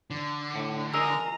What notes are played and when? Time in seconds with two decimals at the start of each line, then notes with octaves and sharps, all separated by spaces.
0.10 D3
0.55 A2
0.94 G#4 A#4 D#5 A#5 E6